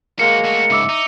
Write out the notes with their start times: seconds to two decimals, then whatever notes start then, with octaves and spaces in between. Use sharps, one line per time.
0.20 G#3 A#3 F#4 C5 C#7
0.45 A3 F#4
0.70 G#2 C#3 E5 D6 E6
0.89 D#4